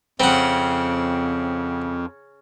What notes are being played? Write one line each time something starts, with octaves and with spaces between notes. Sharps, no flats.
F2 C#3 C4 F#5